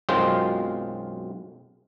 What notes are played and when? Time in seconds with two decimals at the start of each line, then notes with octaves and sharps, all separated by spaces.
0.09 B1 F#2 G#3 C4 F4 C5